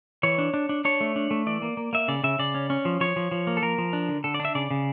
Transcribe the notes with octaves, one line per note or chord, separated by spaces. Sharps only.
E3 C#5
D4
D4
D4
D4 C#5
A3
D4
A3
E3 D5
A#3
A#3
A#3 E5
C#3 D5
C#3 E5
C#3 D5
C#4
C#4
F3
F3 C#5
F3
F3
A#3
A4
F3 A#4
F3
D4
D3
D3 A4
D5
D4 E5
C#3 D5
C#3